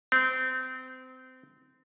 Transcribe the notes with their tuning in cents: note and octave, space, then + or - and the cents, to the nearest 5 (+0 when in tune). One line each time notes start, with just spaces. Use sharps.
C4 -25